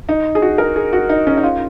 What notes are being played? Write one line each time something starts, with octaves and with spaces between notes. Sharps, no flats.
D#4
G#4
F#4
A#4
G#4
F#4
D#4
C#4
D#4
F4